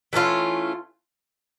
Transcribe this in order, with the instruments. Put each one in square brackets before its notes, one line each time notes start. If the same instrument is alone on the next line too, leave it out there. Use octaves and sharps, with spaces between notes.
[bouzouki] E3 A3 C#4 F4